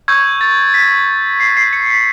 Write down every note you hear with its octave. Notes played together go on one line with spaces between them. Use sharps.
C#6 E6 G6 G#6
A6
B6
C7
C7
C#7
B6